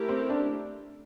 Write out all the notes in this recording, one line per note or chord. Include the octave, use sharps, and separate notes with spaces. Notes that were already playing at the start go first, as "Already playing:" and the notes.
Already playing: A3 E4 G4 A#4
C4
D4